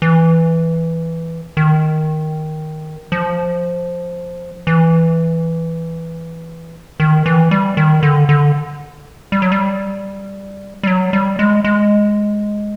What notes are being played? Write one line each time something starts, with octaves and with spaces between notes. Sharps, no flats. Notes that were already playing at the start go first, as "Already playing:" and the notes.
E3
D#3
F3
E3
D#3
E3
G3
D#3
D3
D3
G3
F#3
G3
G3
F#3
G3
G#3
G#3